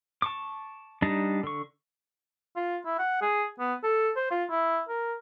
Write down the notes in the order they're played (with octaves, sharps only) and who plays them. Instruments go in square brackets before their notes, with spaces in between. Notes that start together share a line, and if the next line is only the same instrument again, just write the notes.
[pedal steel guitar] A5 C#6 D6
G3 D4 D#4 A5 A#5
D3 C#6
[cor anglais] F4
E4
F#5
G#4
B3
A4
C5
F4
E4
A#4